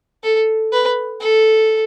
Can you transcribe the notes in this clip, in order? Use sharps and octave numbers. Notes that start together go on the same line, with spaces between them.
A4
B4
A4